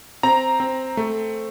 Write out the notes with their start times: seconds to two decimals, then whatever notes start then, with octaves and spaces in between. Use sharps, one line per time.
0.23 C4 A#5
0.60 C4
0.97 A3